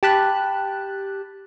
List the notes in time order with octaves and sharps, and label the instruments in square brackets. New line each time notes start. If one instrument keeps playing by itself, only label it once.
[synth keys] G4 A5 B5 F#6